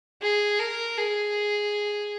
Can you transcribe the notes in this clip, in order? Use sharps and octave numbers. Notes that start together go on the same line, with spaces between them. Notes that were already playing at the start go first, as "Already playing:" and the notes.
G#4
A#4
G#4